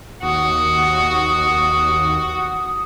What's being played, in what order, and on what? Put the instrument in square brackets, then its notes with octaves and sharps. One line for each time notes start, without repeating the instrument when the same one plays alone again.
[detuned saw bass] D#2 [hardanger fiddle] F#4 [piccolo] D#6